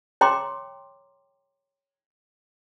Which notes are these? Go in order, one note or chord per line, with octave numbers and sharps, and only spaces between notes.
C#5 G5 A#5 C6 D6